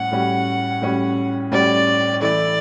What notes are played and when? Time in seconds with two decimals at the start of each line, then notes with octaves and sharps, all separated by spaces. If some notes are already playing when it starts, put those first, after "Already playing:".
Already playing: A2 G3 C#4 F#5
0.11 A2 G3 C#4 F#4
0.82 A2 G3 C#4 F#4
1.52 A2 G3 C#4 F#4 D5
2.21 E3 A3 E4 D5